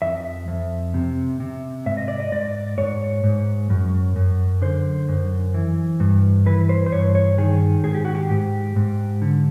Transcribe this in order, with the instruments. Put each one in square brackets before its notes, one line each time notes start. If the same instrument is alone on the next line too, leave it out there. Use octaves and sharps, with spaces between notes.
[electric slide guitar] F2 E5
F2
C3
C3
G#2 E5
D#5
D5
D#5
G#2 D5
G#2 C#5
G#2
F#2
F#2
D3 C5
F#2
E3
G2
E3 B4
C5
C5
G2 C#5
C#5
D#3 G#4
G#2 G#4
G4
F#4
G4
G#2
G#2
D3